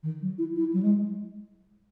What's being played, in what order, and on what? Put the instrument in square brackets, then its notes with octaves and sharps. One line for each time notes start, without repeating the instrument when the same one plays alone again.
[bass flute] D#3
F#3
E4
E4
F#3
G#3